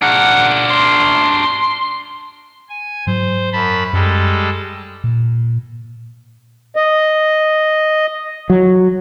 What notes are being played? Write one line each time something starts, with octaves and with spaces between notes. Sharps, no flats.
D4 A#4 F#5
C6
G#5
G#2 F#3 C5
F#2 A5 B5
F#2 G3 G#3 A4
A#2
D#5
F#3